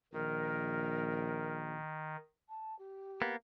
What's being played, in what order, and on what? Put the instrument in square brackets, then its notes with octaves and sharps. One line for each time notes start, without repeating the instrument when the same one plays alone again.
[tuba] A#1 [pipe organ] D#3 [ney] A#4
[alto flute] A5
G4
[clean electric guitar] A#3 B3